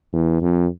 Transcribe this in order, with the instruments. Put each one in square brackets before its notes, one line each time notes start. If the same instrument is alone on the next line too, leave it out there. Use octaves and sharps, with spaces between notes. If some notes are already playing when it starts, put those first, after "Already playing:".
[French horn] E2
F2